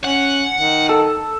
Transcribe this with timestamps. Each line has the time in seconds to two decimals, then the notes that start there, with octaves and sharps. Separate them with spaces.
0.04 C#4 F#5
0.54 D#3
0.89 A4